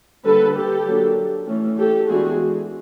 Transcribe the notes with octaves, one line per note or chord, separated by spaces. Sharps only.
D3 G3 A#3 A4 B4
G4 A4
F#3 A#3 D4
E3 A3 C#4
G4 A4
E3 G#3 B3 D4 F#4 G#4